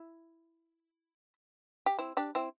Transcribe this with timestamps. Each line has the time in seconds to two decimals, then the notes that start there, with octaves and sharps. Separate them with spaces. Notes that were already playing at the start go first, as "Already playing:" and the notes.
Already playing: E4
1.86 G4
1.99 C4 E4
2.17 D4 G4
2.35 C4 E4